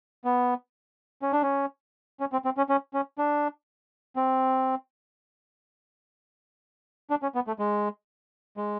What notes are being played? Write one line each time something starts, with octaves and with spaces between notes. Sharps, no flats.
B3
C#4
D4
C#4
C#4
C4
C4
C#4
C#4
C#4
D4
C4
D4
C#4
B3
A3
G#3
G#3